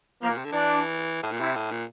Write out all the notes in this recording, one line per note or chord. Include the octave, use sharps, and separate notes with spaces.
F3 A#3
A#2
C3
D3
E3 D4
A2
A#2
C3 E4
A2
A#2